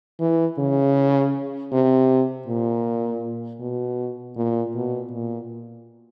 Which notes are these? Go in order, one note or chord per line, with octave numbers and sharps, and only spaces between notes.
E3
C#3
C3
A#2
B2
A#2
B2
A#2